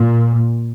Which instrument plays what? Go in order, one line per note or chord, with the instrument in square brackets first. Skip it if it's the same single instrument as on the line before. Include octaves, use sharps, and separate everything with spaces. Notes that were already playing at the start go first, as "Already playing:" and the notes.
Already playing: [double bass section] A#2